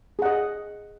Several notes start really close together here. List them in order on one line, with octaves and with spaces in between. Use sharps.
G#4 F#5 D#5